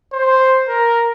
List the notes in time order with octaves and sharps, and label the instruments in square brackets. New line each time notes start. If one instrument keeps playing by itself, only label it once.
[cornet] C5
A#4